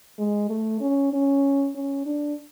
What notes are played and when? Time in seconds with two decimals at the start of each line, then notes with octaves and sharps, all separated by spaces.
0.18 G#3
0.50 A3
0.80 C#4
1.12 C#4
1.75 C#4
2.06 D4